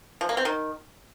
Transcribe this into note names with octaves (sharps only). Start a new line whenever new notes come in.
F3
A#3
C4
D#3